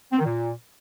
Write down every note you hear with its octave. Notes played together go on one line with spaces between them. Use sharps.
C4
D#3
A#2